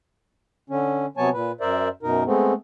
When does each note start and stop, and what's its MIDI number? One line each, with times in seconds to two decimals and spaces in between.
0.70 1.06 50
0.70 1.06 61
1.17 1.29 48
1.17 1.29 54
1.17 1.29 59
1.17 1.29 73
1.17 1.29 80
1.17 1.29 81
1.33 1.52 46
1.33 1.52 71
1.61 1.88 42
1.61 1.88 70
1.61 1.88 72
1.61 1.88 74
1.61 1.88 76
2.03 2.24 42
2.03 2.24 47
2.03 2.24 63
2.03 2.24 70
2.26 2.53 56
2.26 2.53 57
2.26 2.53 59
2.26 2.53 60